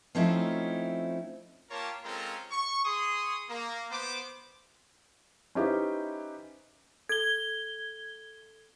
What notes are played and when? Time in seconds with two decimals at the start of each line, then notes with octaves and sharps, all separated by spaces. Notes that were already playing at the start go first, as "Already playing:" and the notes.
0.15 F3 A3 C4 C#4 D#4 E4
1.70 A#3 F4 G4 A#4 C#5 A5
2.04 G#3 C4 C#4 F4 A4 A#4
2.50 C#6
2.83 G#4 C6 C#6 D#6
3.48 A#3
3.91 B3 C5 D6
5.55 C#4 D#4 E4 G4 B4 C5
7.09 A4 G#6 G7